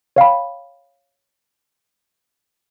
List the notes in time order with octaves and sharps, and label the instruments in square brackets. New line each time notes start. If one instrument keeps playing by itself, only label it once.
[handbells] C#5 F5 G5 B5